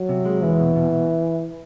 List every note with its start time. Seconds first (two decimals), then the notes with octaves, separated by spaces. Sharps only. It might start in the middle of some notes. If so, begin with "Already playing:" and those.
Already playing: F#3
0.09 C3
0.25 G#3
0.42 E2 E3
0.60 B2
0.75 B2
0.92 B2